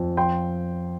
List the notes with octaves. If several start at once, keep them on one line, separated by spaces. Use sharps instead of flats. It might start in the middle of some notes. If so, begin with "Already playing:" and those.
Already playing: F2
F3 G5 C6